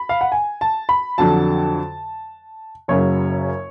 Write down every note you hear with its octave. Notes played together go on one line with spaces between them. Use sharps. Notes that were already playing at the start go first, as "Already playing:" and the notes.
Already playing: B5
F5
F#5
G#5
A5
B5
F2 D3 F#3 A5
F#1 F#2 C#3 F#3 C#5